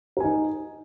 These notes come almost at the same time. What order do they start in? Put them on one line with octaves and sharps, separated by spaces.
A#4 G#5 D#4